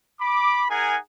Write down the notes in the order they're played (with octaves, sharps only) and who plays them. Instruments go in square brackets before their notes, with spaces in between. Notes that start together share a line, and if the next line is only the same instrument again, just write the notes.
[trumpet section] B5 D6
D#4 G#4 A#4 F#5 G#5